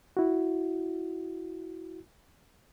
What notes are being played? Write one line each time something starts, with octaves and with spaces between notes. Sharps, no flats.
E4 F#4